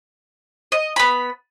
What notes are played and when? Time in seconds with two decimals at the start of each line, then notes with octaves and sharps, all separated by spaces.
0.72 D#5
0.96 B3 B5